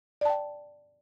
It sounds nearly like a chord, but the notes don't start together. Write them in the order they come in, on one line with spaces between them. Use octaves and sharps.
D5 A5 G5